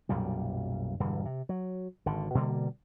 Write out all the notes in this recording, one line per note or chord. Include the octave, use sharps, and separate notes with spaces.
B1 F#2 A#2 G3
E1 G2 D3
C3
F#3
G#1 D3
B2 D3 G3 A#3